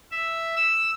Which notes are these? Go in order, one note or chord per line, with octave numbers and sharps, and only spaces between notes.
E5
E6